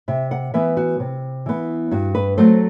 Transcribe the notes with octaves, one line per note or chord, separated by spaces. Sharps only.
C3 E5
F#5
E3 B3 E5
F#4
C3
E3 B3
G2 F#4
B4
F#3 A3 C4 C5